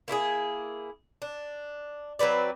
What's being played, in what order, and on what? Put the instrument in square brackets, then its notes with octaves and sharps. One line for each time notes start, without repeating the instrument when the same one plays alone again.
[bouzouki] A#3 E4 G4 G#4
D4
F#3 C4 B4 D5